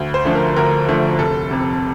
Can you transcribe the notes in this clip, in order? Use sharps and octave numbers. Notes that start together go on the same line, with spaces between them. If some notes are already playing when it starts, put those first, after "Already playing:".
Already playing: D2
C5
D3 F3 A3
A#4
D2 A#4
D3 F3 A3
F1 A4
F2 C3